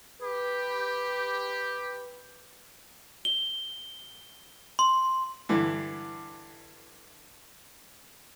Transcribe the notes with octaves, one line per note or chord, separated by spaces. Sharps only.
G4 B4
G7
C6
G2 D3 E3